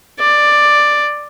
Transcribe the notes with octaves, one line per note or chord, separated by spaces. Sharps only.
D5